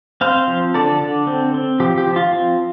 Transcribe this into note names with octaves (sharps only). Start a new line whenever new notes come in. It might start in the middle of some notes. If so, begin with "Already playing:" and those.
C4 C5 F5
F3
D3 A4 D5
D3
C4
C4
F3 G4
G4
F3
F4
C4